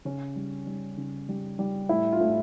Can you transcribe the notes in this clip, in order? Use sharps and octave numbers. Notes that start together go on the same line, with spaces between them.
C#3 C#4
G3
G3
C#3
G3
G3
A2 E4
F4
A2